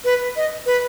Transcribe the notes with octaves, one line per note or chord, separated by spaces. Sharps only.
B4
D#5
B4